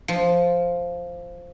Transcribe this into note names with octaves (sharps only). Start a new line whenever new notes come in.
F3